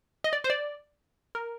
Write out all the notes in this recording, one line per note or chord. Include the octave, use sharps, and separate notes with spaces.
D#5
D5
C5
D5
A#4